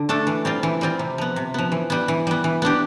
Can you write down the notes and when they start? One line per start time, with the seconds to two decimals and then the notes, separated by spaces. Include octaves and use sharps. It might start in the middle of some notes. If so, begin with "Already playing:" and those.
Already playing: D3
0.09 A3 D4 A4
0.27 E3
0.45 G3 C4 F4
0.63 E3
0.81 G3 C4 F4
0.99 C3
1.18 F3 B3
1.36 C3
1.54 F3 B3
1.72 E3
1.90 G3 B3
2.08 E3
2.27 G3 B3
2.44 E3
2.62 B3 D4 G4